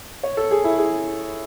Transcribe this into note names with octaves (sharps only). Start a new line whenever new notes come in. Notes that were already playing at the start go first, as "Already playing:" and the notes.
C#5
A4
G#4
E4
G#4